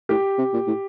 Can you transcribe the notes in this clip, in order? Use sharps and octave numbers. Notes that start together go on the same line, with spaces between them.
A2 G4
C3
A#2
A2